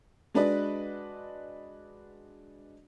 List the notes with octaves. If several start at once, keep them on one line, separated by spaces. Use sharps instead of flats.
G#3 D4 F#4 B4 D5 D#5